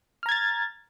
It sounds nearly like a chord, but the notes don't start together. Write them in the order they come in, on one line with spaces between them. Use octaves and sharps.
F6 A#5 G#6 A6